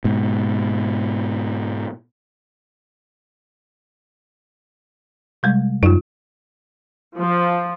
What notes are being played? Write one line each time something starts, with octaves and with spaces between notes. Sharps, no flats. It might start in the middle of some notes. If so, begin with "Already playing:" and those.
G#2 B2
C3 G3 G#3
F#2 D#4 F4
F3